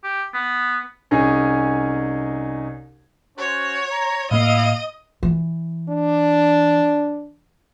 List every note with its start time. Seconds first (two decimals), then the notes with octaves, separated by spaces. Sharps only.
0.04 G4
0.34 B3
1.11 C2 C#4 D#4 G#4
3.38 C#4 F#4 C5 C#5
3.91 A#5
4.31 A2 A#3 E4 D#5 F5
5.23 E3
5.89 D4